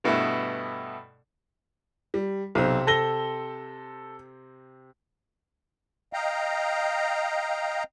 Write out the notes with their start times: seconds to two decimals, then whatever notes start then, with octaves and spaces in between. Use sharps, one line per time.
0.04 G2 B2 A3 B3 E4
2.14 G3
2.55 B1 C3 C4
2.87 A4 A#6 G7
6.13 D#5 F5 G5 A#5